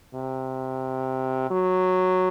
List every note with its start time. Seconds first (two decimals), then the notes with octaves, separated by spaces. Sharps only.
0.15 C3
1.51 F#3